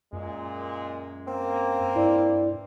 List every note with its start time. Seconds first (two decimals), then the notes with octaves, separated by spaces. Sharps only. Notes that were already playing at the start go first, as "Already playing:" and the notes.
0.13 F#2 A#2 G#3
1.28 A#3 C4
1.96 G2 E4 D5